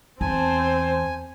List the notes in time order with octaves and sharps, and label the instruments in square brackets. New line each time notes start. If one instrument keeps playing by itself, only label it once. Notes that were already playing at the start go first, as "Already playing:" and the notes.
[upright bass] E2 [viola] C4 C5 [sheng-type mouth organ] G#5 [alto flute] A5